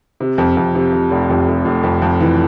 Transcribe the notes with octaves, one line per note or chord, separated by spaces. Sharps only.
C3
F2
F2
C3
C3
F1
F2
F1
F1
F2
F2
E3